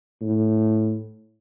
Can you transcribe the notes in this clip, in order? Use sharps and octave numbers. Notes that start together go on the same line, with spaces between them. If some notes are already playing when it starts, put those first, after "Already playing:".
A2